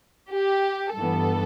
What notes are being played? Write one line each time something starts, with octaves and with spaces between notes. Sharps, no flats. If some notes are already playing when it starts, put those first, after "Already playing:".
G4
G2 E3 B3 A4